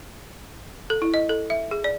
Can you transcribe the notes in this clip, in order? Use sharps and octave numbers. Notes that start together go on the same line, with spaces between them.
A4
E4
D#5
A4
E5
G#4
D5